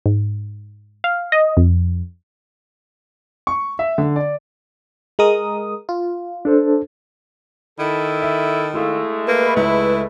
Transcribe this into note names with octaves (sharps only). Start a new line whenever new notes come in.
G#2
F5
D#5
F2
C#6
E5
D3
D5
G#3 A#4 D#6
F4
D4 A4 C5
D#3 E4 A4
E5
G#3 A3 E4 F5
A#3 B4
C#2 E4